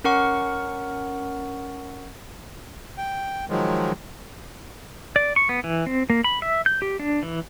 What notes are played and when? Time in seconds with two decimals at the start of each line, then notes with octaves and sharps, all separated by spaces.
0.04 C#4 A#4 F#5 C#6
2.98 G5
3.50 D#3 F3 F#3 G#3
5.16 D5
5.36 C#6
5.49 B3
5.64 E3
5.87 C4
6.10 A#3
6.24 B5
6.42 E5
6.66 G6
6.82 G4
6.99 D4
7.23 E3